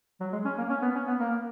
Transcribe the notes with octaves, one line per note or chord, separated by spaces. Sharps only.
F#3
G#3
C#4
A#3
C#4
B3
C#4
B3
A#3